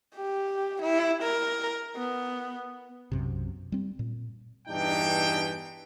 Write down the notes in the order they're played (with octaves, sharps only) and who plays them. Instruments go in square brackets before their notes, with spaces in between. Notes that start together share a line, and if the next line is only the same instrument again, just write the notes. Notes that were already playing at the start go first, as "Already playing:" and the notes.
[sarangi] G4
E4
A#4
B3
[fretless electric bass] B1 F#2 C3
G3 C4
A#2
[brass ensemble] E2 G2 E3 D4 D#4 G5